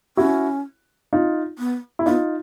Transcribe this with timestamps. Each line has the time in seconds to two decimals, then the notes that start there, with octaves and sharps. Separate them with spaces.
0.17 C#4 E4 F#4
1.13 D#4 F4
1.59 B3
1.99 E4
2.06 B3 D#4 F4